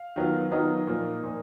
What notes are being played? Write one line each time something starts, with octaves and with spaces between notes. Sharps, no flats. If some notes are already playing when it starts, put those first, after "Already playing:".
Already playing: F5
D#3 F#3 B3 F4
D#3 F#3 B3 D#4 F4 D#5
A#2 F3 A#3
A#2 F3 A#3